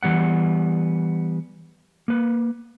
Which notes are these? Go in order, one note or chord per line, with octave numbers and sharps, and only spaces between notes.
E3 G3 B3 F#5
A#3 B4